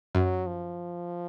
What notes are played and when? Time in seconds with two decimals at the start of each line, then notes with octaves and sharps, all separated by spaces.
0.15 F#2 F#3
0.47 F3